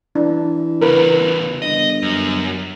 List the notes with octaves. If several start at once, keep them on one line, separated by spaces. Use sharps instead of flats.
E3 D4
E2 C#3 A#4 B4
G1 D#5
F#2